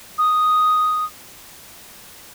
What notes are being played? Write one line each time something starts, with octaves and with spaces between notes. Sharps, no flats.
D#6